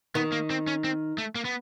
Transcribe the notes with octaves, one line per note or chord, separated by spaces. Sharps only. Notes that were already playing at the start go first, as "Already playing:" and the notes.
D#3 B3
A#3
C4
C#4
C4
A3
A#3
B3